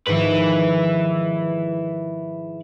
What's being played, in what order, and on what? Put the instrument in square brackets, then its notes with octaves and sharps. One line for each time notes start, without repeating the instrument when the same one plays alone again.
[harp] G#2 D#3 F3 [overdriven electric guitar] E4 B4